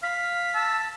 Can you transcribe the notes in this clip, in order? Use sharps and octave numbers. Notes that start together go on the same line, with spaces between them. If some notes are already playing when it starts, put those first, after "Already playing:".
F5 B6
A5 E6